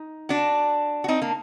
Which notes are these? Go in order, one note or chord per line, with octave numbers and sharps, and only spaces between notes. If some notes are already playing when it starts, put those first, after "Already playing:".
Already playing: D#4
D4 F#4
F#4
C4 D#4
A#3 D4